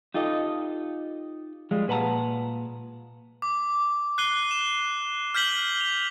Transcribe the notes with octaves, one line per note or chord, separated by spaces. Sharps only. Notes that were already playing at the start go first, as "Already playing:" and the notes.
D#4 F4 G4 A4 D#5
F3 G3 G#3 F4
A#2 B4 F#5 A5 A#5
D6
F#6 C7 D#7 G7
E7
F6 G6 B6 F#7 G7
F7